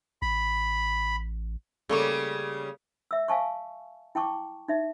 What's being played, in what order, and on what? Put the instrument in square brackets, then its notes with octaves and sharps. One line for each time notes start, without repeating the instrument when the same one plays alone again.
[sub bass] A1 [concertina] B5
[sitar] C#3 G3 [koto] A3 A#3 C#5
[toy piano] E5 E6
F5 G#5 A5 C#6
E4 G5 A5 C#6 D6
D#4 E5